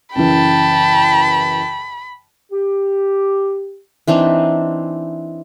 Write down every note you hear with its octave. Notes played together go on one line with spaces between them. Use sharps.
F#2 C#3 E3 G5 A5 B5
G4
E3 C4 D4 D#4